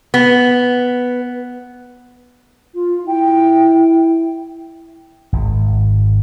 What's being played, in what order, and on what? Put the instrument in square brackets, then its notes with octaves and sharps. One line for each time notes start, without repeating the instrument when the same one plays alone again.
[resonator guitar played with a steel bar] B3
[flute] F4
[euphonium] E4 [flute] G5
[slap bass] G#1